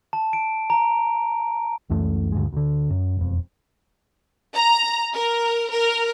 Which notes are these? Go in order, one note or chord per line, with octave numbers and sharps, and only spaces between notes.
A5
D7
A#5
C#2 F#2 E3 A3
D2 G2 G#3
D2 D3
F#2
E1 F2
A#5
A#4
A#4